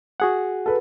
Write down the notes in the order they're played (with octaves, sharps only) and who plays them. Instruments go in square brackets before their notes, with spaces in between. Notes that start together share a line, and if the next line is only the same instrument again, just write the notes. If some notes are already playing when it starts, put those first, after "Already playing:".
[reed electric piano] F#4 G#4 F#5
[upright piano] A4 B4